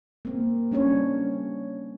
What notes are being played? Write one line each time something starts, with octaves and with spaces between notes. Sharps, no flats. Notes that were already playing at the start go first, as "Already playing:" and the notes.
A#3 C4
G3 C#4 D4 C#5